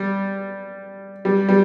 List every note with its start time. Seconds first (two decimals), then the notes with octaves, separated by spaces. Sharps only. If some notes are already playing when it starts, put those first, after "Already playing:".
Already playing: G3
1.25 G3
1.48 G3